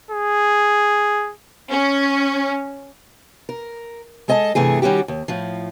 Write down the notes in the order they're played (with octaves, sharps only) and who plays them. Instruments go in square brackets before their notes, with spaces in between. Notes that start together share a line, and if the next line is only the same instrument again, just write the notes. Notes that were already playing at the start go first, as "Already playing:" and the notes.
[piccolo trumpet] G#4
[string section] C#4
[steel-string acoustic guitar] A#4
G#3 A4 D#5 G#5 A5
G2 C3 E3 A3 G#4
D#3 G3 C#4 F#4 G4
D#2
A2 F3